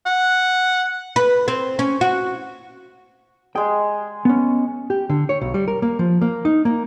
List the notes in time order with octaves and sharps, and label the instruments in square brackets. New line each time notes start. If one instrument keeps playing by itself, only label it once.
[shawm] F#5
[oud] B4
C4
C#4
F#4
[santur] G#3 G#4 [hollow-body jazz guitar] G5
[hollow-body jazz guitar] B3 C#4
G4
D3
C#5
B1
G3
A#4
A#3
F3
A#3
D#4
A#3